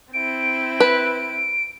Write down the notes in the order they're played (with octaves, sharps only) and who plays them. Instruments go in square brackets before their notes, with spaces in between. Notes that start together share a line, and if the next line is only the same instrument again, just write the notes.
[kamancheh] C4 E4 [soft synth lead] D7
[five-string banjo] B4